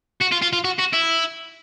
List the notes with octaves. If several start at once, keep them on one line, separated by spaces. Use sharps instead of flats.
F#4
F4
F4
F4
F#4
F#4
E4